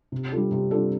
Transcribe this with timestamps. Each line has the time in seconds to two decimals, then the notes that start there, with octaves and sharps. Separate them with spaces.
0.12 C3
0.32 G3 D4 F4 A4
0.52 C3
0.71 G3 D4 F4 A4